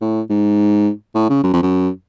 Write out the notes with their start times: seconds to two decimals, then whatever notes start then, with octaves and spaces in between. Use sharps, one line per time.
0.02 A2
0.30 G#2
1.15 A2
1.30 C#3
1.44 F#2
1.53 F2
1.62 F#2